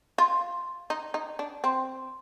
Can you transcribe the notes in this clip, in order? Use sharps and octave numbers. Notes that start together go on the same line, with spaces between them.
F4
D#4
D#4
D4
C4